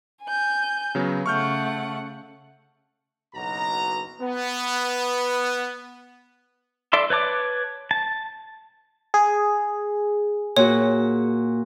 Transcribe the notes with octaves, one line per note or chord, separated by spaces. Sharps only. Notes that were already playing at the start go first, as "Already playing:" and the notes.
G#5 G6
C#3 F#3 B3
C#3 A3 F#5 C#6 F6 G6
F#1 B1 B2 F#4 A#5
B3
A4 D5 E5 C6
B4 C#5 A5 D6
A5
G#4
A#2 F#4 C#5